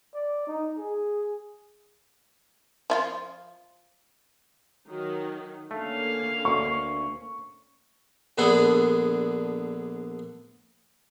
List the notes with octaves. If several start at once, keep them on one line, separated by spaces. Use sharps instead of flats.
D5
D#4
G#4
F3 E4 F4
D#3 F#3 D#4
D3 A3 A#3 C#4 F5
D2 C#6
A#1 D3 B3 D4 G#4 A4